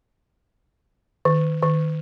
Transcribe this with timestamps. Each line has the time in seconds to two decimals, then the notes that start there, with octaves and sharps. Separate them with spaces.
1.25 D#3
1.62 D#3